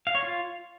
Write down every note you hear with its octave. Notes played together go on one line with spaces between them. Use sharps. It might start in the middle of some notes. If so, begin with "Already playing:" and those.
F5
C#5
F4